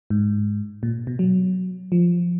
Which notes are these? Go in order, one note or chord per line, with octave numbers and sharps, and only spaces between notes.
G#2
A#2
B2
F#3
F3